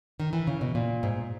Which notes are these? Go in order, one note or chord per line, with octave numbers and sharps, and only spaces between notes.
D#3
E3
C#3
B2
A#2
G#2